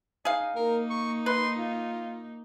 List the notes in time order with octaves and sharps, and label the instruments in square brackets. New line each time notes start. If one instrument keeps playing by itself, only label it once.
[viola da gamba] D#4 [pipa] G#4 F5
[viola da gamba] A#3 D#4 [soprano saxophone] A#4
[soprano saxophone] C#6
[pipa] B4 [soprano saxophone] C6
[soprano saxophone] F4